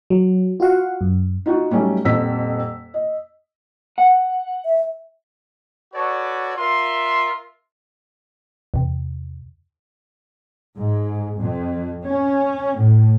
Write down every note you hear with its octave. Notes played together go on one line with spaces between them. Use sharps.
F#3
F4 F#4 F5 F#5
F#2
D#4 F4 F#4
F#3 G3 A3 C#4 D#4
D#1 F2 C4 E6 B6
D#5
F#5
E5
F#4 A4 B4 C#5 D5
F4 A#4 E5 C6
E2 C3
G#2
F2
C#4
A2